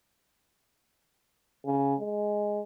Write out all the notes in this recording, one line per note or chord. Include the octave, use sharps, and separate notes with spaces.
C#3
G#3